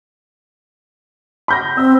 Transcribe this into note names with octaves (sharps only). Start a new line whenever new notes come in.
B5 G6 A#6
C4 E6